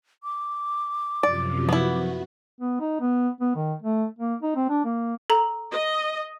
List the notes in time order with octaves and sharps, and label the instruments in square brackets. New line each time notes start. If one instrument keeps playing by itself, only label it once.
[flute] D6
[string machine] F#2 C3 F3 [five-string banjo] D5
[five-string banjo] B3 E4 [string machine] F#4
[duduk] B3
D#4
B3
B3
D#3
A3
A#3
D#4
C4
D4
A#3
[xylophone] A4 A#5
[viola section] D#5